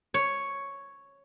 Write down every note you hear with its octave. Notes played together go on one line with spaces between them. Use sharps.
C#5